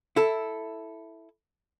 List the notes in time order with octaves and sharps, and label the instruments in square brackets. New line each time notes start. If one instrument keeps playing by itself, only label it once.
[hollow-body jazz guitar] E4 A4